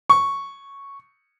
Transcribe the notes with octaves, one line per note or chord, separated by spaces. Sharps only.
C#6